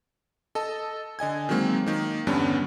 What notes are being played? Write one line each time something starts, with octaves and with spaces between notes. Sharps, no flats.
A4 D#5 A5
D3 D#5 G#5 G#6
D#3 F#3 G#3 A#3 C4
D#3 A#3
E2 G2 D3 G3 B3 C#4